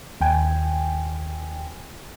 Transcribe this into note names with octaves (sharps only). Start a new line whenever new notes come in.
D#2 G5 G#5